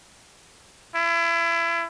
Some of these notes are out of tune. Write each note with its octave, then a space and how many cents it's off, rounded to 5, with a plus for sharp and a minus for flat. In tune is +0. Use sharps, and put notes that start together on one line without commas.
E4 +30